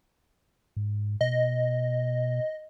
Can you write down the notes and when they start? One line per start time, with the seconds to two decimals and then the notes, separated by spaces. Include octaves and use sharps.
0.77 G#2
1.21 B2 D#5